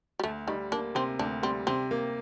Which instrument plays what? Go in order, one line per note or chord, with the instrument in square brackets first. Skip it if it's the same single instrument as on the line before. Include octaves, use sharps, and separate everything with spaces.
[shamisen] G3
[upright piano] D2 [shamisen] A3
[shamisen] D#3 [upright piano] G3
[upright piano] A#3 [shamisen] D4
[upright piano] C3 [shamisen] C4
[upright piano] D2 [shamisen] D4
[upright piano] G3 [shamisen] C4
[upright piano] C3 [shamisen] C4
[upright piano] A#3